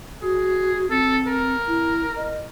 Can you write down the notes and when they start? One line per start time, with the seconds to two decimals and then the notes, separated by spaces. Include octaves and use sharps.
0.22 F#4 G#4
0.90 C4 A4
1.27 A#4
1.68 E4
2.17 D#5